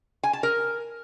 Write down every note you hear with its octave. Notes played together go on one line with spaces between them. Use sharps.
G#5
A5
A#4